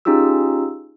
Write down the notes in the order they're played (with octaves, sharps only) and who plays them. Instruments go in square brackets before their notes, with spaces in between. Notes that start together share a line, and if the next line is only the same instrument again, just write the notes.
[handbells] C#4 D#4 F4 G4 G#4 E6